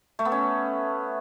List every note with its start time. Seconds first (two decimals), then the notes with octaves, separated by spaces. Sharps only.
0.19 A3
0.25 B3
0.32 C#4